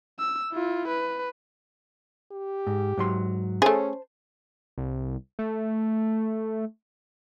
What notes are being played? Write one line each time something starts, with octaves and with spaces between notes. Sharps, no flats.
E6
E4 F4
B4
G4
G#2
G#2 F#3 C6
A3 C#4 G#4 C5 A5
C2
A3